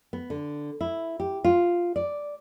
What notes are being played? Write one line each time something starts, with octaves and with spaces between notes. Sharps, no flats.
B3
D3
E4
G4
F4
D5